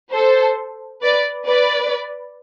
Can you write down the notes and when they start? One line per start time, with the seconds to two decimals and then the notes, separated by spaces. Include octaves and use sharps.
0.13 A4 C5
1.03 B4 D5
1.48 B4 D5